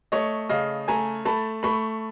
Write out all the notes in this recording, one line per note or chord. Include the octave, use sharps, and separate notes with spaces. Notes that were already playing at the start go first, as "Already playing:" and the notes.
A3 C#5 D#5
C#3 D#5 F5
A3 G#5 A#5
A3 A5 B5
A3 B5 C#6